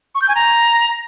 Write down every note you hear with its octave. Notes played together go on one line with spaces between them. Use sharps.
C#6
G6
G#5
A#5